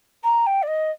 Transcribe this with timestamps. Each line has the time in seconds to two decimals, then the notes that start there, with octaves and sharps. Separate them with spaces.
0.23 A#5
0.46 G5
0.62 D5
0.67 D#5